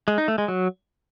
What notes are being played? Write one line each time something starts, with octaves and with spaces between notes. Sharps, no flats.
G#3
D#4
A3
G#3
F#3